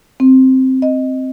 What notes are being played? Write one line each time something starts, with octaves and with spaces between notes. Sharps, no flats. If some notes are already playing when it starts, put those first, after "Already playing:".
C4
D#5